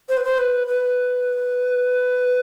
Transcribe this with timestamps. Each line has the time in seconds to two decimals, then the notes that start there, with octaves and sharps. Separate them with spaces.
0.09 C5
0.17 B4
0.24 C5
0.38 B4
0.67 B4